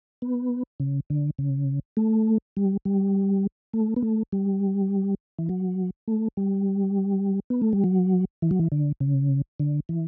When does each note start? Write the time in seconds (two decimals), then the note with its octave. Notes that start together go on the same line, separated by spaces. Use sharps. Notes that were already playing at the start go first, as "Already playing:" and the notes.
0.22 B3
0.80 C#3
1.10 D3
1.38 C#3
1.97 A3
2.57 G3
2.85 G3
3.73 A3
3.96 B3
4.02 A3
4.32 G3
5.39 E3
5.49 F#3
6.08 A3
6.37 G3
7.50 B3
7.62 A3
7.73 G3
7.84 F#3
8.42 E3
8.51 F#3
8.59 E3
8.72 D3
9.00 C#3
9.60 D3
9.89 E3